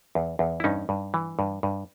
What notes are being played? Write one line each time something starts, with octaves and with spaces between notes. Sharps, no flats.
E2
E2
E4
G2 C#4 D#4
G2
E3
G2
G2